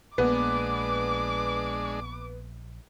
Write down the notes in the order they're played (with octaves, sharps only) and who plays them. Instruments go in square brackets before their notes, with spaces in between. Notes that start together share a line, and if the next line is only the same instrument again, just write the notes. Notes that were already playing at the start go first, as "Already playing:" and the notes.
[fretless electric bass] A#1 A#3 [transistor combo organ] G#3 D4 [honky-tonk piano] B3 [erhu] D6